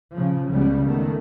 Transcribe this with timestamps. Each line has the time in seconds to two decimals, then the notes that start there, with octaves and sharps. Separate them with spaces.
0.13 C#3 F3
0.50 C#2 C#3 F3 G3 G#3 B3
0.85 D#3 A3 B3